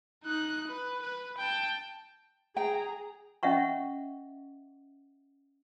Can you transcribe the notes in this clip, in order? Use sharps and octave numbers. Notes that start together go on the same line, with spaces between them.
D#4 F#6
B4
B4
G5 A5
G#4 G5 A#5
C#4 D#5 E5 F#5 C#6